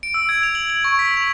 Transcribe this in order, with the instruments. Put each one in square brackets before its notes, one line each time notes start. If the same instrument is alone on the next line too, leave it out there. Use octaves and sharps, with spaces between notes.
[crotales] D7
E6
G#6
F7
F#7
F#7
C#6
B6
F7